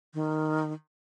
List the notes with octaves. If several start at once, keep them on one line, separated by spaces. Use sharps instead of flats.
D#3